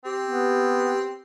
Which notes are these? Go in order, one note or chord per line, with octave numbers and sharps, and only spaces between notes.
C4 G4
B3